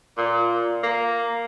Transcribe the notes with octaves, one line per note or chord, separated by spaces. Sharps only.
A#2
A#3